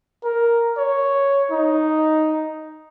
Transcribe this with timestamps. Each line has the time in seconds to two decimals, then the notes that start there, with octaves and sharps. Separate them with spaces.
0.24 A#4
0.78 C#5
1.51 D#4